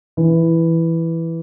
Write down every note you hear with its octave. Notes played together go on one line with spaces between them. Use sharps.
E3